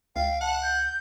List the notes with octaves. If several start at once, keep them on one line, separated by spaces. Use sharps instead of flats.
C#2 F5 G5
F#5 A5
G6